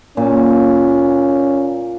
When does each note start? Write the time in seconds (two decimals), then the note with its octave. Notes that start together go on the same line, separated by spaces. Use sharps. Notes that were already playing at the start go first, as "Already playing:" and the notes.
0.17 A#2 C#4